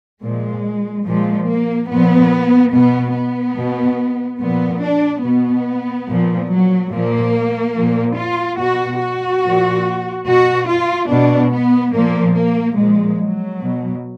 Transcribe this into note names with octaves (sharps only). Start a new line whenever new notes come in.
A#2 F3 G#3
A#2 F3 G#3
A#3
A#2 F3 B3
B2 B3
B3
B2
A#2 F3 B3
D4
B2 B3
A#2 F3
F#3
A#2 F3 A#3
A#2 F3
F4
B2 F#4
F#4
A#2 F3
B2 F#4
F4
B2 D4
B3
A#2 F3 A#3
A#3
A#2 F3 G#3
F#3
B2